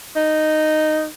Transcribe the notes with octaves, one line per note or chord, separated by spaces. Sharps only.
D#4